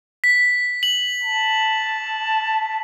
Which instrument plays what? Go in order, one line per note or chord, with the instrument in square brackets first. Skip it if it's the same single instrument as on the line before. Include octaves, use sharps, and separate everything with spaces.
[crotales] B6
F#7
[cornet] A5